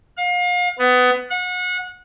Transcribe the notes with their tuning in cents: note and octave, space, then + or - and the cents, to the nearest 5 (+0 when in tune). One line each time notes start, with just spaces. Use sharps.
F5 +35
B3 +20
F#5 -30